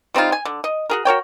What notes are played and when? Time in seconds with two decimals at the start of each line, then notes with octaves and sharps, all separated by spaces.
0.14 G3 C4 D#4 F4
0.32 G#5
0.45 D3
0.64 D#5
0.90 F#4 G#4 A#4
1.05 F#4 A#4 C#5 G5